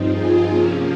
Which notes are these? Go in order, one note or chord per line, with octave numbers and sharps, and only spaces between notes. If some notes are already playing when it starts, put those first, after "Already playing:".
Already playing: G2 F3 C4 D#4
F4 G#4
C3 F3 A#3 C#4